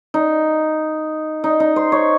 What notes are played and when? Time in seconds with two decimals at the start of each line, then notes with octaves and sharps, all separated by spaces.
0.14 D#4
1.44 D#4
1.60 D#4
1.76 C5
1.92 C#5